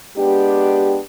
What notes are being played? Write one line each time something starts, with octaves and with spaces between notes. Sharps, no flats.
G#3 B3 D4 G4